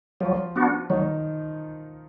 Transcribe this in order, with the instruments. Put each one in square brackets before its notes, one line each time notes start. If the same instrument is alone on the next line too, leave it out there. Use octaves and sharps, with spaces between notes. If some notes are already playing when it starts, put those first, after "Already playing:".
[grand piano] F3 F4 [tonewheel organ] F#3
[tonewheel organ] B3 D4 F#4
[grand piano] D#3 D#4 [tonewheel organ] F#3